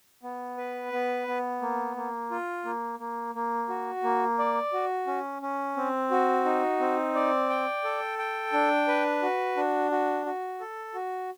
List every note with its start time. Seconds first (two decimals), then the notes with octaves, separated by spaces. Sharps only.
0.23 B3
0.58 B4
0.92 B3
1.27 B3
1.62 A#3
1.97 A#3
2.31 F4
2.65 A#3
2.99 A#3
3.35 A#3
3.69 F#4
4.03 A#3
4.39 D5
4.73 F#4
5.07 C#4
5.42 C#4
5.77 C4
6.11 F#4
6.45 D#4
6.80 C4
7.15 D5
7.49 G5
7.84 A4
8.18 G5
8.53 D4
8.88 B4
9.22 F#4
9.57 D4
9.91 F#4
10.26 F#4
10.60 A4
10.94 F#4